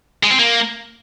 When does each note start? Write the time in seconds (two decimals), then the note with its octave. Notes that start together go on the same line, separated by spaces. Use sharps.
0.23 G#3
0.31 C4
0.39 A#3